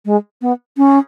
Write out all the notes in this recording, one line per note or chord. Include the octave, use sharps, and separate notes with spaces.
G#3
B3
C#4